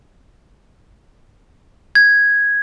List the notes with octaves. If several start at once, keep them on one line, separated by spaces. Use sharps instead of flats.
G#6